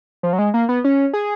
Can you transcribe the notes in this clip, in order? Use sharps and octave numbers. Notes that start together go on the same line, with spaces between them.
F3
F#3
G#3
A#3
B3
C#4
G#4